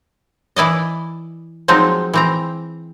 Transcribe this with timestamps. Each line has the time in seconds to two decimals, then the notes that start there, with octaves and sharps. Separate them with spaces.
0.56 E3 E4 D5 D#5
1.68 F3 F#3 G#3 C4 D#4
2.14 E3 C4 A#5